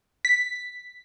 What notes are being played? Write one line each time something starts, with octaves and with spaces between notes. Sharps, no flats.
B6